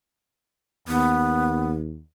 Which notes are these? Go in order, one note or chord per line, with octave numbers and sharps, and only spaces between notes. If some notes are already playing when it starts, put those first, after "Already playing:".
D#2 B3